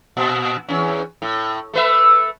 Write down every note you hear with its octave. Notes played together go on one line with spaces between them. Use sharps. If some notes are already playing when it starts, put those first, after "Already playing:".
A#2
E2 C#4
A2
A3 B4 E5